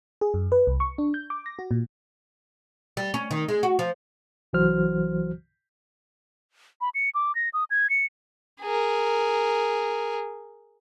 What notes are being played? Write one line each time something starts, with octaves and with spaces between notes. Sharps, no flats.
G#4
F#2
B4
C2
C#6
D4
G6
D6
A#6
F#4
A#2
G3
C#4
D#3
G#3
F#4
F3
C2 E3 F#3 F#4 C5 F6
B5
C#7
D6
A#6
D#6
G#6
C#7
G#4 A#4